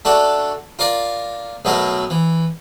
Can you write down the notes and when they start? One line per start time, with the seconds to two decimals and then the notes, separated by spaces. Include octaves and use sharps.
0.05 A3 D4 F#4 A4
0.79 F4 A#4 D5 F5
1.65 B1 B2 F#3 A3 A#4
2.10 E3